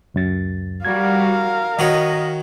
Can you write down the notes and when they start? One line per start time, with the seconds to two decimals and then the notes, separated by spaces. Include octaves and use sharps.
0.14 C#2 F#2 A6
0.85 G3 F#4 A#4 F5 G#6
1.79 D#3 F#4 C#5 D#5